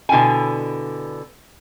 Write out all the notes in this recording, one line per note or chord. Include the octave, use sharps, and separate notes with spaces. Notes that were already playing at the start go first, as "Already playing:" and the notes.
B2 D3 E4 G5 G#5